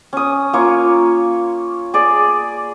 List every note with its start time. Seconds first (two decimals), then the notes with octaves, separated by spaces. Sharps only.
0.13 C#4 D#6
0.53 A#3 F4 C#5
1.94 G#4 D5